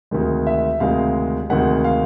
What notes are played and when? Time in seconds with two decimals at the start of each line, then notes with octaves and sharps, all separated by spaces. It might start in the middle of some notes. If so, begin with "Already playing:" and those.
0.11 D2 C3 D#3 G#3
0.47 E5
0.80 D2 C3 D#3 G#3 F5
1.50 D2 C3 D#3 G#3 F#5
1.84 F5